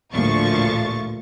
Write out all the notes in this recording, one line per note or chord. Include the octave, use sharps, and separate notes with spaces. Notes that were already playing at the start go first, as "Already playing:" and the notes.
A1 D2 A#2 F3 C#6 A6